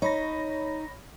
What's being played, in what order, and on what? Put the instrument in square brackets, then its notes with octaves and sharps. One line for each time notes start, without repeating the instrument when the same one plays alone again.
[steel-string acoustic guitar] D#4 [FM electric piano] C#5 B5 A#6